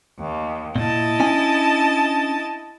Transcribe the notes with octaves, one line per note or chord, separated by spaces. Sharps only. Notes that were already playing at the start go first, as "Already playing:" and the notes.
D#2
A#2 E4 D#5 A5
C#4 D4 G#5